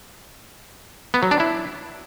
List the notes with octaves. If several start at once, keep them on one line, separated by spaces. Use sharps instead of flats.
B3
F#3
D4
E4